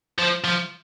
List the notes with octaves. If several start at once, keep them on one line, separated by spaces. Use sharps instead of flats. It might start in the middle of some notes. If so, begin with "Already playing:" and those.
F3
F3